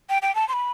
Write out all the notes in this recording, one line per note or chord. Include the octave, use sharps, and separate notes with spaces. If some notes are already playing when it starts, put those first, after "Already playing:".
G5
G5
A5
C6
B5